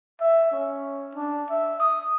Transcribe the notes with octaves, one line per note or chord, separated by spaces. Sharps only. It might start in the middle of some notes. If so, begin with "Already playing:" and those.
E5
C#4
D4
E5
D#6